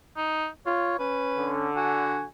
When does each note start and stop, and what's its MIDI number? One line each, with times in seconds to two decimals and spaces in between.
0.17 0.47 63
0.66 0.98 65
0.66 0.95 73
0.99 1.69 61
0.99 1.52 71
1.37 2.23 50
1.76 2.24 66
1.76 2.27 80